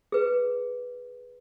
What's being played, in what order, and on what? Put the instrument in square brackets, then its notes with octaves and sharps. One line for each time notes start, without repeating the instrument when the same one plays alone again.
[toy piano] G#4 B4